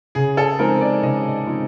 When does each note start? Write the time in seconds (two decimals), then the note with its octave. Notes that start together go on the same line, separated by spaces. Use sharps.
0.15 C#3 G#4
0.37 A4
0.59 F3 G#3 C4 D#4 A#4
0.81 D5
1.03 C#3 D#5
1.47 F3 G#3 C4 D#4